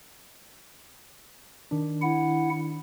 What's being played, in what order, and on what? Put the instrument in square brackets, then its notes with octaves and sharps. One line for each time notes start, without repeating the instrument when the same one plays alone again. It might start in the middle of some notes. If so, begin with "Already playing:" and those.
[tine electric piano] D#3 D4
[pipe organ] E4 F#5